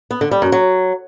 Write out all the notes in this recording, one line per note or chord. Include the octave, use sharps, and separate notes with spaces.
B3
D3
G3
F#2
F#3